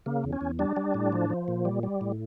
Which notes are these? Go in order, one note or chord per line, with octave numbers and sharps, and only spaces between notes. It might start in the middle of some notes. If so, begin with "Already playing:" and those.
C#3 A#3
E2
C#4
E2
G3 D4
G3
A2
F3
F3
A#2
G3
G3
A2